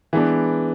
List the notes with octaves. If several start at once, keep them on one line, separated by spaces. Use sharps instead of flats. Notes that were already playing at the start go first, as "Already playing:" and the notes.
E3 G#3 B3 D4